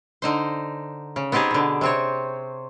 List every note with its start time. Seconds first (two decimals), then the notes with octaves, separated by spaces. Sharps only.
0.22 D3 D#4 C5
1.16 C#3
1.32 B3 C4 D#4 G4 G#4
1.51 B2 D3
1.81 C3 C4 C#5